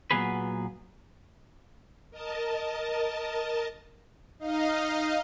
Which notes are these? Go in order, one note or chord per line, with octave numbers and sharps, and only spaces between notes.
A#2 F3 F#3 B3 G#4 B4
A#4 D#5 A5
D#4 D#5 F5